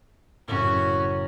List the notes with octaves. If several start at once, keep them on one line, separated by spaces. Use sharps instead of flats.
F#1 F#2 A2 C#4 F#4